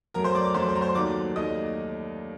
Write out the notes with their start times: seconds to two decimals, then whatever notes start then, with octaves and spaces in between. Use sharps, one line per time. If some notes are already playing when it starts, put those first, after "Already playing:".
0.14 F#2 F#3 A3 A#4 A#5
0.24 C5 C6
0.35 D5 D6
0.45 D6
0.55 F#2 F#3 A3 C5 C6
0.68 C5 C6
0.75 A#5
0.81 C5 C6
0.95 D#2 D#3 F#3 A3 D5 D6
1.36 D#2 D#3 F#3 A3 D#5 D#6